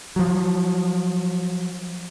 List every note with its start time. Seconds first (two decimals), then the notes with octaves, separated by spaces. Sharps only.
0.16 F3 F#3